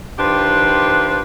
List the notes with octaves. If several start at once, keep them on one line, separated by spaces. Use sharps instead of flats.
D#3 D4 F4 G4 B4 C5